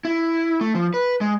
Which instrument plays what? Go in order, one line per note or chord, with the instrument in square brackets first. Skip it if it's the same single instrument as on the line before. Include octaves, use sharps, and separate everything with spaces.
[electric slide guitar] E4
A3
F3
B4
G#3